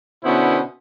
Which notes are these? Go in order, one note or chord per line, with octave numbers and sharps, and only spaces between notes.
B2 D3 B3 C#4 E4 C5